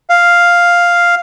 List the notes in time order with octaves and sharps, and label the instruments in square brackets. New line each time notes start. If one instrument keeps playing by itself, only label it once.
[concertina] F5